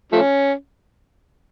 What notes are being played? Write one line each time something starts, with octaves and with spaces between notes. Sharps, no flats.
F3 A3 C#4